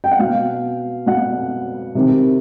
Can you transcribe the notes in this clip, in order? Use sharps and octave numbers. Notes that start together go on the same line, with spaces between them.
G5
F#5
B2 F5
B2 F#5
C3 D#3